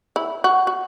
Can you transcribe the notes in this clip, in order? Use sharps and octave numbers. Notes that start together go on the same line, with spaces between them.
E4
F#4
F#4